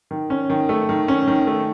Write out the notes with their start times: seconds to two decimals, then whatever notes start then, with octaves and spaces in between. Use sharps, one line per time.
0.11 D#3
0.30 C#4
0.50 D#3
0.69 A3
0.89 D#3
1.08 C#4
1.28 D#3
1.47 A3